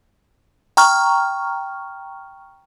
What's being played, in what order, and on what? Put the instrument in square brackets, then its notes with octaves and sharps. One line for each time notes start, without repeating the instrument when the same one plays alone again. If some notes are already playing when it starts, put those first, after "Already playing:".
[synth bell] G5 A#5 C#6 F6